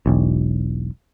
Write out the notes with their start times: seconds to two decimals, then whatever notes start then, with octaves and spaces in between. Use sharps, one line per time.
0.06 E1 B1